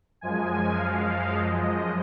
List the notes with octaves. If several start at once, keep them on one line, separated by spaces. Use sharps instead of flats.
F#2 F3 G#3 G#5
F5
D#5